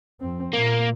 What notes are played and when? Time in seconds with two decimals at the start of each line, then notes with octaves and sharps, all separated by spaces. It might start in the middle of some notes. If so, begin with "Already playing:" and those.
0.21 F2 C4
0.53 A#2 A#3